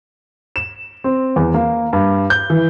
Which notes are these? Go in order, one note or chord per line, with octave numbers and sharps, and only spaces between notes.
E7
C4
E2
A#3
G2
G6
E3